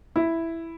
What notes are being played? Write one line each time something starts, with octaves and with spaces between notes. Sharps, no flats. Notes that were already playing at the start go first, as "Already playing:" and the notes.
E4